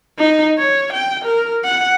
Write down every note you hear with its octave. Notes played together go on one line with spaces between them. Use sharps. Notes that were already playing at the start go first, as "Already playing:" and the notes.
D#4
C#5
G5
A#4
F#5